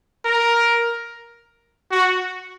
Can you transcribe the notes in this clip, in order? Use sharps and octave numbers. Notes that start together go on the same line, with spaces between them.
A#4
F#4